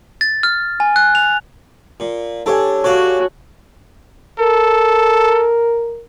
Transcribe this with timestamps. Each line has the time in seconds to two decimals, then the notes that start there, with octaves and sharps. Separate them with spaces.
0.21 A6
0.43 F6
0.80 G#5
0.96 F#6
1.15 F7
2.00 A#2
2.46 G3 D4 A4 C#5 G#5
2.84 F#4 G4 C#5 D5 F5
4.39 A4 A#4